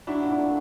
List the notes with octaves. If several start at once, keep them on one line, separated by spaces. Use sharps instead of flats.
F#3 D4 E4
A#2
D4 E4
A3